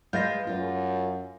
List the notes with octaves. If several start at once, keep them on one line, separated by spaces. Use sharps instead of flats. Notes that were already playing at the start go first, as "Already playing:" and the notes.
G#3 B4 F5 G6 A6 A#6
F#2 F4